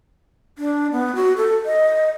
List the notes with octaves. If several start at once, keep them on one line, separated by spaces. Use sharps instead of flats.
D4
B3
F#4
A4
D#5